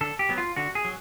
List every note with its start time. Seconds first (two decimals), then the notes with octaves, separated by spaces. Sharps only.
0.01 D3 A4
0.19 G4
0.29 F#3 B3
0.38 F4
0.56 D3 F#4
0.75 G#4
0.85 F#3